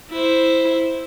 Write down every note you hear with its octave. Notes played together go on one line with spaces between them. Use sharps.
E4 C5